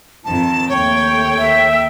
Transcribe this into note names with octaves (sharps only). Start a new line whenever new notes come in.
F2 D#3 F3 A5
D#2 A3 C#5 G5
E5